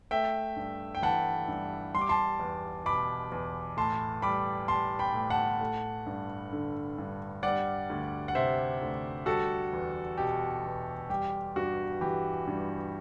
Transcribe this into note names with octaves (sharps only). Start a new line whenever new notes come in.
A3 E5 G5
G2
G5
E3 F#5 A5
G2
G3 C6
D6
A5 C6
E2
B2 B5 D6
E2
A2 A5 C6
G3 B5 D6
G3 A5 C6
G5 B5
A2
F#5 A5
A3
G2
D3
G2
G3 D5 F#5
D2
F#5
C3 C5 E5
D2
G3 F#4 A4
E2
B2 G4
E2
G3 G4
G2 F#4
E3 G4
G2